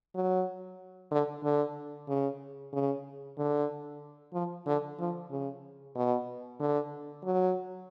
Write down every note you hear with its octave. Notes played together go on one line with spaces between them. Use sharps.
F#3
D3
D3
C#3
C#3
D3
F3
D3
F3
C#3
B2
D3
F#3